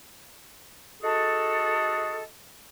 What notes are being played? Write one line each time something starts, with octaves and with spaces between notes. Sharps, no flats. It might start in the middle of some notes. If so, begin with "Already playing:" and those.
D#4 F#4 G#4 A4